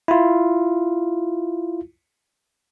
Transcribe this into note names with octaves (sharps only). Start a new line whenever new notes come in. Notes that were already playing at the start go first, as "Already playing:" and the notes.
E4 F4